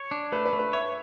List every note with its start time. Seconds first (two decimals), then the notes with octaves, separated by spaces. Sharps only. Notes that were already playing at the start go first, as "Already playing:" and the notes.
Already playing: C#5
0.11 D4
0.32 A3 B4
0.46 B4
0.53 A3
0.59 B4
0.73 C#5 E5